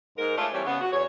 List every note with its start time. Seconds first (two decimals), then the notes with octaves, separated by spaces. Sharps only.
0.18 G#2 A#4
0.38 G#3 A3 F4 C#5 D5
0.53 E3 G3 C4 C#5
0.65 C#3 B3
0.81 F#4
0.93 E2 C#5